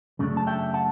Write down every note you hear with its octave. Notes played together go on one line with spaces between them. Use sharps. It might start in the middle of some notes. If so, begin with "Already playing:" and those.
F#2 C#3 A3 D4
A5
E5 G5
F#5 A5